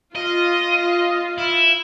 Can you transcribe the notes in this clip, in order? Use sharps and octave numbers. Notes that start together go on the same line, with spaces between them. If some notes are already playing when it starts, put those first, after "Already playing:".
F4 D#5
E4